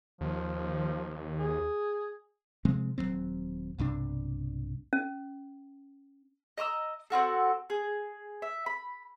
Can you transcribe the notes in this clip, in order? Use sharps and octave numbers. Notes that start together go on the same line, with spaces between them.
D#2 F3
G#4
C3 F3 G#3 C4
D#1 F2 F#3 C4
B1 G2 C3 D4
C#4
D#5 A#5 D6 E6
C4 F4 F#4 A4
G#4
E5
B5